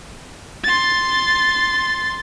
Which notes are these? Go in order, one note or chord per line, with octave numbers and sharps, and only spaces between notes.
C6 A6